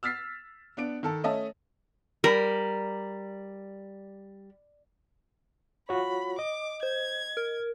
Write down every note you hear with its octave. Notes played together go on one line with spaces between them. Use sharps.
E6 F6 A6 B6 C7
B3 D4 D7
D#3 A4 A5
A3 C#4 D#5 E5 A5
G3 A#4
F4 F#4 C#5 B5
D#5 D6
C5 G#6
A#4